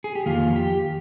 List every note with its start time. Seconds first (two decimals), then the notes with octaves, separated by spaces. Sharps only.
0.04 G#4
0.15 G4
0.26 F2 D#3 A#3 F4
0.56 G4